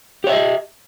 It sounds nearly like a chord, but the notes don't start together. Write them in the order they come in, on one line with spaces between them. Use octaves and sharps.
G4 C#5 E5 D#5